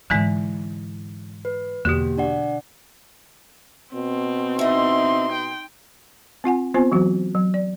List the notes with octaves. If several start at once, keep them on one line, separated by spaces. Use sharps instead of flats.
G#2 D3 E3 G#3 E4
B4
E2 B2 D3 A#3 F#4 G4
D4 D5 F#5
B2 C4
D#4 E4 D#5 C6
G5
C4 F4 F#5 G#5
B3 C4 F4 C5 G#5
E3 F#3 F#4
F#3
D5